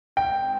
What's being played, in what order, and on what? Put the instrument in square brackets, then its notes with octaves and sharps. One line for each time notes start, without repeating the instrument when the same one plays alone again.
[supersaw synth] D#3 G#3 C4 [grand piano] G5